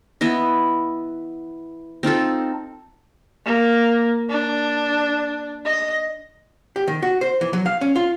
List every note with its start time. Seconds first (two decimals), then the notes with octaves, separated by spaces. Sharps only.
0.21 E3 B3 E4 D#5
2.03 C4 D#4 F4 A4
3.45 A#3
4.29 D4
5.65 D#5
6.76 G4
6.88 D#3
7.02 F#4
7.21 C5
7.41 E3
7.53 F#3
7.66 F5
7.81 C#4
7.96 F4